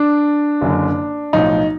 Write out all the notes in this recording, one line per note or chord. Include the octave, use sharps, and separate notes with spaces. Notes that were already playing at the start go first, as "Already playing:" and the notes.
Already playing: D4
F#1 F#2 D3
B1 A2 F3 D#4